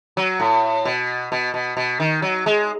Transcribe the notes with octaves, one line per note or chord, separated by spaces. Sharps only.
F#3
A2
B2
B2
B2
B2
D#3
F#3
G#3